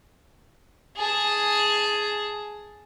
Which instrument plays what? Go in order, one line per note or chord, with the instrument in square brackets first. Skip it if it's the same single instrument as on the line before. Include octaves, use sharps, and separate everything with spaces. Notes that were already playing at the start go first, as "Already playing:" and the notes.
[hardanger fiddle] G#4 A5